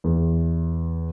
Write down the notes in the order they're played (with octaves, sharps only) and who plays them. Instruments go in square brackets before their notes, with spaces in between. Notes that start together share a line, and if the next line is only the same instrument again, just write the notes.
[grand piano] E2